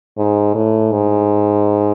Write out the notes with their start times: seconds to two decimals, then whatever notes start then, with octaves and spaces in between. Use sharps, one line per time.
0.18 G#2
0.55 A2
0.92 G#2